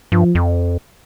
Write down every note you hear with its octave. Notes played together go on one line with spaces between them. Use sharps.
G2 F3
F2